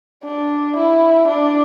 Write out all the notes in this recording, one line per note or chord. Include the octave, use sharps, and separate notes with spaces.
D4
E4
D4